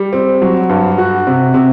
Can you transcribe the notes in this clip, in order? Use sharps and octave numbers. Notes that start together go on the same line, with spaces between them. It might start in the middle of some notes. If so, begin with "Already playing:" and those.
Already playing: G3
C4
F#3
G2
F#4
C3
C3